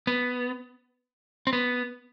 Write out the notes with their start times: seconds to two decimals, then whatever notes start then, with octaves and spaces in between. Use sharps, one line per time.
0.07 B3
1.47 C4
1.53 B3